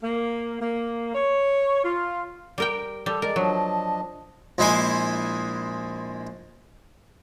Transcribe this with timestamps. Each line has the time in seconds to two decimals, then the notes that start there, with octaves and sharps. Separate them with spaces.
0.03 A#3
0.61 A#3
1.15 C#5
1.83 F4
2.58 G3 A#4 G5
3.06 G3 A4
3.22 G#3 A#4 D5
3.36 F3 F#3 D4 D#5
4.58 A#1 G#3 E4 C5 G#5